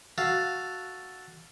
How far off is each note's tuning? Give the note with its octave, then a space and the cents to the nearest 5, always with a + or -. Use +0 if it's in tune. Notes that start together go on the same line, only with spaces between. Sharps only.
F#4 +0 A4 +0 F5 +0